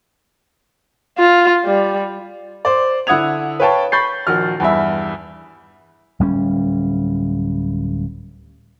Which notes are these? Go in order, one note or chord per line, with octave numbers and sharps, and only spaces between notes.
F4
G3
C5 D5
D3 E4 F#5 D#6 G#6 F7
B4 C#5 F5 G5 A5 C#6
B5 C#6 G6 A6 C7
A#1 D#3 F#4 F6
E2 G2 E5
D1 G3 C#4